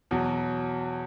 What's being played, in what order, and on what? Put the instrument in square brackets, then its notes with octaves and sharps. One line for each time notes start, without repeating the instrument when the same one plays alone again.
[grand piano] E2 B2 F#3